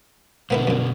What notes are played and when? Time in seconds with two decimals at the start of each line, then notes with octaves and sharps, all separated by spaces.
0.50 B2 D3 A#3 B3 E4
0.67 F#2 A#2